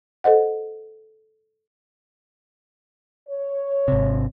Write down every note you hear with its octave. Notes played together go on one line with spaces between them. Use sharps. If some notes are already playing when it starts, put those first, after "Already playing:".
A4 C5 D#5 F#5
C#5
G#1 C3